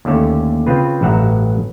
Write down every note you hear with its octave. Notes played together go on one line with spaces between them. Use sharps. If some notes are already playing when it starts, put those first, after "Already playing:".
D#2 D3 A3 C#4
C#3 C4 F4 B4
A1 G2 F#3 E5 F#5 A#5